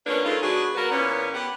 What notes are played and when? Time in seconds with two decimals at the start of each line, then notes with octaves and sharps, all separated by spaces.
0.06 F3 A#3 B3 C#4 D4 B4
0.24 D#3 G#3 A3 C4 D#4 F4
0.42 F#3 B3 D4 F#4 G#4
0.75 F#3 B3 F#4 A#4 B4
0.91 E2 A#2 B3 C#4
1.34 B3 G4 F#5